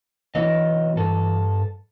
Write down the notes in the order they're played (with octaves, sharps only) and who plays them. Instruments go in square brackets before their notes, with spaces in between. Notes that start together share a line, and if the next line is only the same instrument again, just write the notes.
[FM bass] E3 [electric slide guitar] F#3 B3 D#5
[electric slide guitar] G2 A4